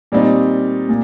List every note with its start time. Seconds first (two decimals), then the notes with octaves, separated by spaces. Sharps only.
0.12 A#2 G3 C4 D#4
0.89 A#2